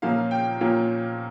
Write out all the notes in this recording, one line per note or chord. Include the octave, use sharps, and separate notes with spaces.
A#2 F3 A#3 C#4 F5
G5
A#2 F3 A#3 C#4